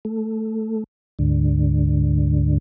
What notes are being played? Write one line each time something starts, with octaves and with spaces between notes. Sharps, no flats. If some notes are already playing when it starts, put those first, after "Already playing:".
A3
D2 G#2 D3